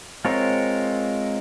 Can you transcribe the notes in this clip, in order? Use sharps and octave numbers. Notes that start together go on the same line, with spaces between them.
G#3 C4 F4 A#4 C#5